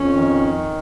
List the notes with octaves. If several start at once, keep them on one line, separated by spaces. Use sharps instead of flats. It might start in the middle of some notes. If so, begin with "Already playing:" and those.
Already playing: F2 C#4
D#3